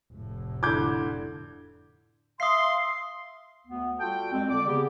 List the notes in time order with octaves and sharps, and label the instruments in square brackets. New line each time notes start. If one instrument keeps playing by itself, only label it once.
[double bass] F1 A2
[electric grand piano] D3 G#6 [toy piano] E4 F4 [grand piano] D6 G6
[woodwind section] E5 F5 C6 [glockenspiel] D#6 C7
[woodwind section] D2 B3
G3 F4 F#4 A4 G5
F2 G#3 C4
D3 D5 D6
C#3 B3 G4 G#4